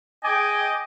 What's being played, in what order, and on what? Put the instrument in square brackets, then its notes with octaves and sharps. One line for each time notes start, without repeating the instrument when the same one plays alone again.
[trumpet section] G#4 G5 G#5 [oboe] D#5 [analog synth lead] D6